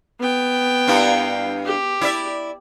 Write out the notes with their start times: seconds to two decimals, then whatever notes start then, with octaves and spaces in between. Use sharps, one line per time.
0.20 B3 G5
0.87 G2 A#3 E4
1.66 G4
2.01 E4 D5 E5